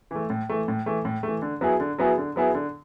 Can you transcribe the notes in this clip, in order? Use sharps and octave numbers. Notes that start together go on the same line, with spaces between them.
E3 A3
A2
E3 A3
A2
E3 A3
A2
E3 A3
D3
F#3 B3 E4 G#4
D3
F#3 B3 E4 G#4
D3
F#3 B3 E4 G#4
D3